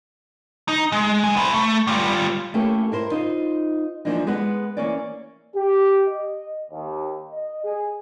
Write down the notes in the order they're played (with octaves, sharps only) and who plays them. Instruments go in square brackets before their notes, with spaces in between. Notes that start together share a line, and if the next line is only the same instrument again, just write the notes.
[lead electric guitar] D#4
G#3
D3 G#5
E4 C5
A3
G3 F4
[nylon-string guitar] A3 A#3 C#4 E4 G4 A4
E4 A#4 C5
D#4 F4 C5 D#5
E3 F3 A#3 D4 D#4
G#3 B3 B4 F#5
E3 A3 A#3 C#4 C#5 D5
[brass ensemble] G4
D#5
D#2
D#5
G#4